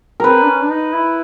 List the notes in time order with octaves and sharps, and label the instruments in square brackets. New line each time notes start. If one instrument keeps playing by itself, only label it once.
[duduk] C4 [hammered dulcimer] A#4 B4
[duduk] D4
C#4
D4
D#4
E4